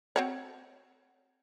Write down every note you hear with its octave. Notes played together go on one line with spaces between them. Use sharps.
C4 F#4 C#5